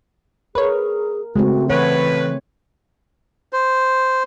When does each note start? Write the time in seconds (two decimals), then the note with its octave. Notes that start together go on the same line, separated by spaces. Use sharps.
0.55 G#4 A#4 B4 C#5
1.36 C#3 G#3 A3 C4 F#4
1.70 A2 E3 B4 C#5 F#5
3.53 C5